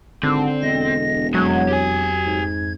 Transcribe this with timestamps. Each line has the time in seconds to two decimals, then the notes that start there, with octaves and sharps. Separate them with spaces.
0.23 G#1 D3 C4
0.61 E1 D#5 A#6
1.34 F2 F#3 G#3 A3 G#6
1.69 G4 G#5
2.26 G#2